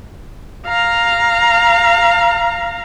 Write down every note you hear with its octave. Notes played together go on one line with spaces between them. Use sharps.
F5 A#5